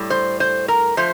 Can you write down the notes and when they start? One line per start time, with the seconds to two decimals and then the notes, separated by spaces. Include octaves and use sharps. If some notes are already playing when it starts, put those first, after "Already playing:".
Already playing: A2 G3
0.10 C5
0.40 C5
0.68 A#4
0.97 F3 A3 C5